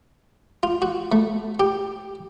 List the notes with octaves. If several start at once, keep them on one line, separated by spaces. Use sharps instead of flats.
F4
F#4
A3
G4